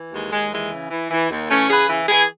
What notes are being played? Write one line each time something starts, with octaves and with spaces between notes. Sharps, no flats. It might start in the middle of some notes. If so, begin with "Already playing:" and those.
Already playing: E3
D#2 G#3
D#2 G#3
E3 G#3
C#3
E3
E3
D#2
E3 A3 C#4
C#3 G#4 B4
E3
E3 E4 G#4